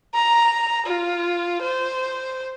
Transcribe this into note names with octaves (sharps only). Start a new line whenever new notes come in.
A#5
F4
C5